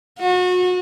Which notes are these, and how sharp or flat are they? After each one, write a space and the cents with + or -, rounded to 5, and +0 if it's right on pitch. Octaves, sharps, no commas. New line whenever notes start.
F#4 -30